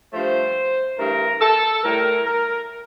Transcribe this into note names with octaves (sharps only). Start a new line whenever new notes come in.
G2 F3 A3 C5
G2 E3 A3 A#4
A4
A2 G3 A#4
A#4